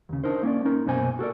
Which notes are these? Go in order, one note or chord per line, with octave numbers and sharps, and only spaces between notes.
D#2 C#3
D4 D#4 A#4 C5
A#3 C#4 D5
C#4 D#4 A#4
C2 F#2 B2 A#3 C5 G#5
F#4 A4 A#4 D5